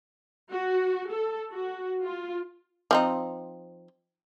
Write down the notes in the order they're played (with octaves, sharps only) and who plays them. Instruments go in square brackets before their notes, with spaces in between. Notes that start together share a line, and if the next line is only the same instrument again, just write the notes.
[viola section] F#4
A4
F#4
F4
[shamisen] F3 C4 D#4